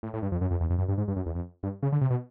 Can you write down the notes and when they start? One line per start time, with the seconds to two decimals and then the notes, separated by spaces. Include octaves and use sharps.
0.03 A2
0.14 A2
0.22 G2
0.32 F2
0.41 F#2
0.51 F2
0.61 E2
0.70 F2
0.78 F#2
0.88 G2
0.98 G#2
1.08 G2
1.16 F#2
1.26 E2
1.35 F2
1.63 G2
1.83 C#3
1.92 D3
2.01 C3
2.10 B2